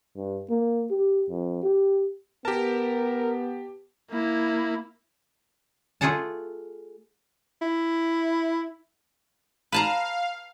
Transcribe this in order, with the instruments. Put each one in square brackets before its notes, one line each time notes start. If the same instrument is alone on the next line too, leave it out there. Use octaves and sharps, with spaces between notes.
[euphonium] G2
A#3
G4
F2
G4
[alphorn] B3 [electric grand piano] G4 A5 [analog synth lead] A#4
[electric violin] A#3 E4
[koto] A3 F4 G#4 A4 F#5 A5
[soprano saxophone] E4
[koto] B4 A5 A#5 [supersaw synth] F5